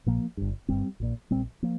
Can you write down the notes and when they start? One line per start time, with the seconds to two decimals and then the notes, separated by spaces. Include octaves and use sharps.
0.06 A#1 A#2 F3 A#3
0.37 G1 G2
0.68 G1 G2 G3 C4
1.00 A#1 A#2
1.31 A#1 A#2 G3 C4
1.62 F3 A#3